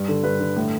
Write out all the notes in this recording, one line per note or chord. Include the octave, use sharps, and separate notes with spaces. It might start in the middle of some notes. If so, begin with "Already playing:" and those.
Already playing: G2
D3
G2 B4
D3
A2